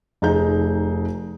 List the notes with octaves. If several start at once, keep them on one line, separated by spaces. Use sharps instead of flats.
F1 D#4 G#4 G6